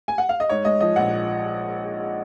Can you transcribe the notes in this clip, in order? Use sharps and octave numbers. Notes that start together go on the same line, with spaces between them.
G#5
F#5
F5
D#5
G#2 C#5
G#3 D#5
F3 D#5
A#1 F#5